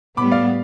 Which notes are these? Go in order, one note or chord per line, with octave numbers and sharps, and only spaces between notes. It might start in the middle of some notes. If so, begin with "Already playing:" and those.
A2 G3 B3 B5 D6
D5 F5